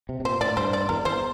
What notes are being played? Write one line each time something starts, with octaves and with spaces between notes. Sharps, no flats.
C3
C3
A#2 C5
A2 D5
G2 C5
D5
E2 A#4
E2 C5